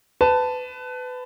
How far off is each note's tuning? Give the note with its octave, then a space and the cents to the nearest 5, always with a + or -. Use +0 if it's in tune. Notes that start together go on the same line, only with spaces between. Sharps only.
B4 +25 A5 +0